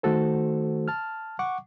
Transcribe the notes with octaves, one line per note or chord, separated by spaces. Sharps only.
D#3 A3 F#4 A4 C5
A5 F6
F#5 C#6 D6